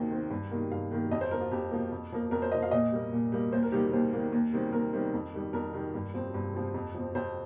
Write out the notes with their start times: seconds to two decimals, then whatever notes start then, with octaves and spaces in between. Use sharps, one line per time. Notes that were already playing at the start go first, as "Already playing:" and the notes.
Already playing: D#2 D#3 C4 G5
0.11 D#3 C4
0.30 G2
0.51 D#3 A#3
0.71 G2 F5
0.92 D#3 A#3
1.11 F2 D#5
1.21 C5
1.31 F3 A#3 A#4
1.41 F4
1.51 F2 G4
1.71 F3 A#3
1.92 F2
2.12 F3 A#3
2.31 F2 A#4
2.42 C5
2.52 F3 A#3 D#5
2.62 F5
2.71 A#2 D#5
2.92 G3 A#3
3.12 A#2
3.32 G3 A#3
3.52 D#2 C5
3.63 A#4
3.72 D#3 G3 A#3 G4
3.93 D#2 C5
4.13 D#3 G3 A#3
4.32 D#2
4.53 D#3 G3 C4
4.73 D#2 A#4
4.93 D#3 G3 C4
5.14 F2
5.34 D#3 G3
5.53 F2 A#4
5.73 D#3 G3
5.94 G2
6.14 F3 C4
6.34 G2
6.54 F3 C4
6.74 F2
6.94 F3 C4
7.15 F2 C5